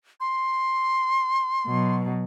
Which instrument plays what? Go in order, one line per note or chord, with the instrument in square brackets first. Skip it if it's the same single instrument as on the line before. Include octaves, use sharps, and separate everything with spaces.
[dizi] C6
[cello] B2 F#3